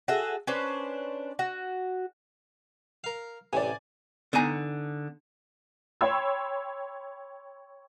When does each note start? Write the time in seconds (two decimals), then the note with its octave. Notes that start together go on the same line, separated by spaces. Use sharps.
0.08 F#4 G#4 A4 E5
0.47 C#4 D4 B4 C5
1.39 F#4
3.04 A#4 F5
3.53 A1 C3 D5 G#5
4.33 D3 B3 D#4 G#5 A#5
6.01 C#5 G5 B5 C6 E6 G#6